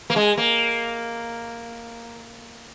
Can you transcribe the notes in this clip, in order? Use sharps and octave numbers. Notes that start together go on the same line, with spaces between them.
A#3
G#3
A#3